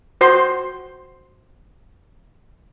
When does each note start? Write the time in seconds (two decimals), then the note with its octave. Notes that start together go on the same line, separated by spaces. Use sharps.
0.21 F#4 C5 C6